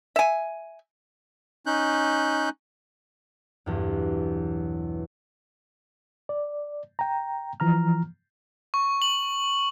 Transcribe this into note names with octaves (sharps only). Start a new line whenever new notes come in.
E5 G#5
C#4 D#4 F#6 G6
B1 E2 G2
D5
G5 A#5
E3 F3 A#5 F6
C#6
F#7